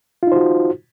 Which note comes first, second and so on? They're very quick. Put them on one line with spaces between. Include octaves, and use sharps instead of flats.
F4 D#4 C5 F#4